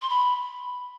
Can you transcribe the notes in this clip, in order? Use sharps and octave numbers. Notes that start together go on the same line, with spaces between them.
C6
B5